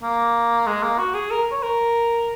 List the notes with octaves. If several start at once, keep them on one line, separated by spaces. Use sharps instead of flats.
A#3
G#3
A#3
F#4
G#4
A#4
C#5
A#4